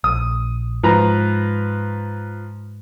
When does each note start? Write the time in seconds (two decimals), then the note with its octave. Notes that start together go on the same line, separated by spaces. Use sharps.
0.04 A#1 D#6
0.83 G#2 F3 B4 A#5